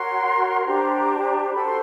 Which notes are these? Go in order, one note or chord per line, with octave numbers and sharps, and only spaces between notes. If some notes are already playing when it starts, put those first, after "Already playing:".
Already playing: F#4 A#4 C#5 C6
D4 G4 C5 A#5
F#4 A4 C5 B5
C6